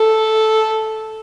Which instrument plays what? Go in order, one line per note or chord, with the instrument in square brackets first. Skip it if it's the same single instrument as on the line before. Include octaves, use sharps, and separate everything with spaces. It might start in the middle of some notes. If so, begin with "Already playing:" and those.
Already playing: [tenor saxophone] A4